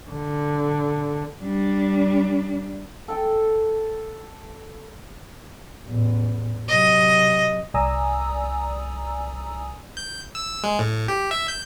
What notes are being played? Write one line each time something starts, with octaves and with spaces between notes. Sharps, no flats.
D3
G3 D4
A4 G5
A1 E2
C3 F#3 D#5
C2 D5 G#5 A#5 D#6 E6
G6
E6
G#3
A2
G4
E5
G6